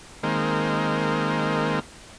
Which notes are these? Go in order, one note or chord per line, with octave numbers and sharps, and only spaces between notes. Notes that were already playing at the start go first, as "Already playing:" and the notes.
D#3 G#3 A#3 C4